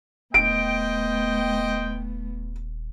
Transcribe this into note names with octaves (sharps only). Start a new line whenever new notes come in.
D#1 A3 B3 C5 D#5 G5 D7